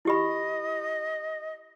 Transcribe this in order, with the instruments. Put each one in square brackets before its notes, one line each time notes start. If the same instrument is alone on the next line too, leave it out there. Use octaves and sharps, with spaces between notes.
[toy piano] E4 G4 B5 [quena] D#5